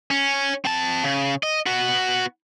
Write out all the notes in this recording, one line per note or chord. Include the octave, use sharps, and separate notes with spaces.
C#4
C4 A5
C#3
D#5
B3 F#4